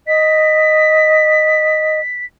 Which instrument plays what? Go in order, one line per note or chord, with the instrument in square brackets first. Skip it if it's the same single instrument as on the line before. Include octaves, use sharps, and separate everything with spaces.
[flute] D#5 [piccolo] B6